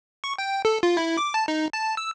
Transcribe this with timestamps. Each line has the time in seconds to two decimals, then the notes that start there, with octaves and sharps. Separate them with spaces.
0.24 C#6
0.38 G5
0.65 A4
0.83 F4
0.97 E4
1.17 D6
1.34 A5
1.48 D#4
1.73 A5
1.97 E6